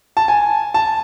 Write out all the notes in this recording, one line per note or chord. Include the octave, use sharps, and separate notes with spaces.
A5
G#5
A5